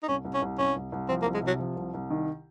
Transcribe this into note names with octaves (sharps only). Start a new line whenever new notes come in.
D#4
C2 C#4
C2
C#4
C2
C2 C#4
C2
C2
F3 C4
A#3
C2
G#3
C3 F#3
F3
C2
C2
D#3